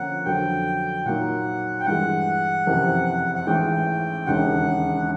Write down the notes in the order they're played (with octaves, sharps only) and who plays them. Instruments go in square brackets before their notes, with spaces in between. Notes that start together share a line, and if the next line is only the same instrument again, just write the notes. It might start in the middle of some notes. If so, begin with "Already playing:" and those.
Already playing: [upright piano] D3 F3 A#3 C#4 [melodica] F#5
[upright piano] F2 D3 F#3 [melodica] G5
[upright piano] A#2 F#3 A#3 D#4 [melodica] F#5
[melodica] G5
[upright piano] G2 E3 G#3 [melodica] F#5
[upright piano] F#1 F2 C3 E3
[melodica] F#5
[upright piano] A1 G#2 E3 [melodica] G5
[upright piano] E1 D#2 C#3 [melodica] F#5